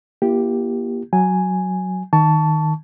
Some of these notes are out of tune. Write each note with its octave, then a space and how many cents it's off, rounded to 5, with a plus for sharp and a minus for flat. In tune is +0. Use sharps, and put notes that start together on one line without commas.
A#3 +35 E4 +45 G4 +0
F#3 +0 G#5 +0
D#3 +0 A5 +0 C#6 +25